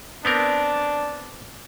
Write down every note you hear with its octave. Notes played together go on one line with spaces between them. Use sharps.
B3 C4 D4 A#4